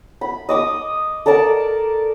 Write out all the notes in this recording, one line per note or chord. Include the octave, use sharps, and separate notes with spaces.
B5
D#5 D6 D#6
A4 A#4 D5 A5